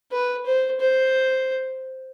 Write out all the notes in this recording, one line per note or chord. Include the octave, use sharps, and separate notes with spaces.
B4
C5
C5